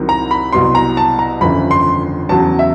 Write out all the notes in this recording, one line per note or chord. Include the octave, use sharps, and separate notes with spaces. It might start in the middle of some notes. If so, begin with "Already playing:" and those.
Already playing: C2 C3 D#3 F#3
A#5
B5
C2 B2 F#3 C6
A#5
A5
A#5
G1 F2 C#3 E3 B5
C6
E2 C#3 F#3 A5
E5